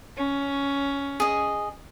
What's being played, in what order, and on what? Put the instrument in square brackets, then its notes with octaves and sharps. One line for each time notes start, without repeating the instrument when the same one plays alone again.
[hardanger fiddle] C#4
[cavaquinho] G#4 D#5